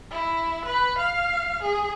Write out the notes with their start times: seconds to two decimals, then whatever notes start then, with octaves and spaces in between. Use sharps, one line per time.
0.11 E4
0.65 B4
0.98 F5
1.62 G#4